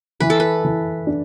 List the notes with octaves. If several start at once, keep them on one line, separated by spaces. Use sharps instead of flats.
E3 B4
A4
B4
E3
D4